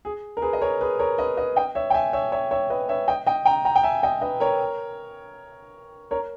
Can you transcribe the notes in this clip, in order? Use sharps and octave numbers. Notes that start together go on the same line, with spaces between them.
G#4
A#4
G#4 B4
D#5
A#4 C#5
G#4 B4
A#4 C#5
B4 D#5
B4 D#5
D#5 G5
C#5 E5
G5
E5 G#5
C#5 E5
C#5 E5
C#5 E5
B4 D#5
C#5 E5
D#5 G5
D#5 G5
G5 A#5
G5 A#5
G5
E5 G#5
D#5 G5
B4 D#5
A#4 C#5
A#4 C#5